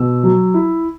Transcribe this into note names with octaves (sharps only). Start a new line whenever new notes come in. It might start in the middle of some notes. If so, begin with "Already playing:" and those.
Already playing: B2 E6
F#3
E4